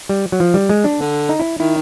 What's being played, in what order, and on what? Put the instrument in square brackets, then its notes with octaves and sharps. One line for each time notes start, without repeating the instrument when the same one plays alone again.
[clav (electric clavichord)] G3
F#3
F3
G3
G#3
D4
[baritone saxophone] D3
[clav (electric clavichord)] D#4
E4
[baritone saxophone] D#3 [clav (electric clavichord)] E4